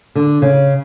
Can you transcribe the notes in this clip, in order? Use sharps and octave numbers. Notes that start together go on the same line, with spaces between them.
D3
C#3